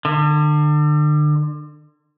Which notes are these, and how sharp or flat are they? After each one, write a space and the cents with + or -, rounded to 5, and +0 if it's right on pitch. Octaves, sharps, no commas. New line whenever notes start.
D3 +35